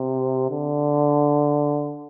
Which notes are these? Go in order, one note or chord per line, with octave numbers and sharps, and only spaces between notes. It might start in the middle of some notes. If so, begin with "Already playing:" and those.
Already playing: C3
D3